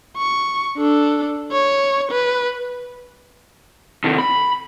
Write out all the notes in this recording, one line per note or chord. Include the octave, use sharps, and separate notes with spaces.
C#6
D4 A4
C#5
B4
C3 D#3
B5